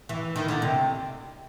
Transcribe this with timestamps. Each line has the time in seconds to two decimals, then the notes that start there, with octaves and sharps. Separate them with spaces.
0.09 E3
0.36 D#3
0.48 D3
0.62 C3